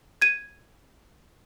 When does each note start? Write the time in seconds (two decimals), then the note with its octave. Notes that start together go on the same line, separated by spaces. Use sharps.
0.22 G#6 D#7